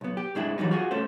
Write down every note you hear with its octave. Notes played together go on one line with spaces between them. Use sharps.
B1 B3
G4
G#2 G#3 D4 E4
E3 F#3 G3 D#4
F4 F#4 G#4
A3 C#4 A4 C5